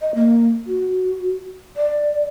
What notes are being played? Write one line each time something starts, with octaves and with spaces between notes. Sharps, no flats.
D#5
A#3
F#4
D5